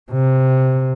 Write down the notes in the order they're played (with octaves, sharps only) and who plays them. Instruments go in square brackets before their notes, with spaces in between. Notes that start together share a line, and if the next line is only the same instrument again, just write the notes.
[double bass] C3